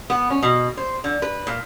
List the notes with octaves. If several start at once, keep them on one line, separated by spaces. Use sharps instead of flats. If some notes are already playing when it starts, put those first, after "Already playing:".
B3
C#4
B2
C5
D3
B4
A#2